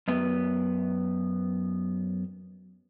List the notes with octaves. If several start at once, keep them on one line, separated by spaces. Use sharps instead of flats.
F#2 B3